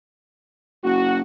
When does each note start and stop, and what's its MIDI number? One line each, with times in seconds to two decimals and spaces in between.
0.84 1.22 30
0.84 1.19 66